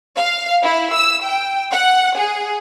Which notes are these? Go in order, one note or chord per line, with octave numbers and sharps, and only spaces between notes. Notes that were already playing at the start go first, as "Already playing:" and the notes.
F5
E4
E6
G5
F#5
G#4